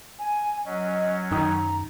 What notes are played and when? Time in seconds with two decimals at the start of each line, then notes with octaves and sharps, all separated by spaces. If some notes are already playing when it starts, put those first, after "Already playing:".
0.19 G#5
0.65 F#3 C#4 D#5
1.31 F#2 D#3 G5 A#5 D#6